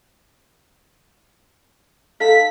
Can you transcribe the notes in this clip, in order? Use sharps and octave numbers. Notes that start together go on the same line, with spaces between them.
D#4 A4 F5 B6